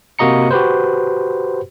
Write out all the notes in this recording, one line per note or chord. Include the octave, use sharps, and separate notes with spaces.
C3 A#3 F#4 D#5 A#5 C#7
F#4 G4 B4 C5